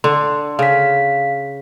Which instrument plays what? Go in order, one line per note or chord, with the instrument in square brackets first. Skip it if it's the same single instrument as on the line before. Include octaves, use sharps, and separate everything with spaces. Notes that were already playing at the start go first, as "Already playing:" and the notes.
[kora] D3 [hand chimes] C6
[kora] C#3 [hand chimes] F5 B6